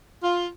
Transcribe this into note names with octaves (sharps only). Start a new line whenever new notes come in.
F4